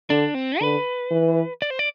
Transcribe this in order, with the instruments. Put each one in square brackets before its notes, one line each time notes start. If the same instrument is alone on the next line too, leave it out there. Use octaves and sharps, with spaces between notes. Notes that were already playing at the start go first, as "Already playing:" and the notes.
[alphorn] D3 [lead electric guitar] D4
[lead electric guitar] C4
[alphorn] D3 [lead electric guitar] B4
[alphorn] E3
[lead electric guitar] D5
C5
D5